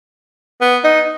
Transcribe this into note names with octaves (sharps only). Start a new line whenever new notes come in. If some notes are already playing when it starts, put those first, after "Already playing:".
B3
D#4